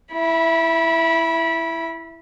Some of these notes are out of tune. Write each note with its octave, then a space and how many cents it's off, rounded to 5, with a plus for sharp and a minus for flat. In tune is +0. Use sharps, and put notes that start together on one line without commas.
E4 +5 B5 -25